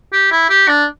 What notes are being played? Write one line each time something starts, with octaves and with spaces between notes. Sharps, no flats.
G4
E4
G4
D4